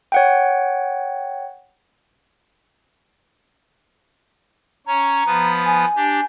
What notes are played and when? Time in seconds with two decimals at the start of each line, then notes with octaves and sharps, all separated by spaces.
0.12 C#5 F#5 G5
4.87 C#4 C#5 A#5
5.26 F3 B3 B4
5.66 G#5
5.96 D4 G4